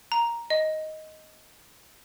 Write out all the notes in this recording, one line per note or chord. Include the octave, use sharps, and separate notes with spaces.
A#5
D#5